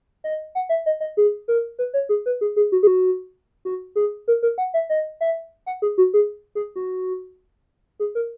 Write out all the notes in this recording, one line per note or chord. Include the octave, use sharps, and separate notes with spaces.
D#5
F#5
E5
D#5
D#5
G#4
A#4
B4
C#5
G#4
B4
G#4
G#4
F#4
G#4
F#4
F#4
G#4
A#4
A#4
F#5
E5
D#5
E5
F#5
G#4
F#4
G#4
G#4
F#4
G#4
A#4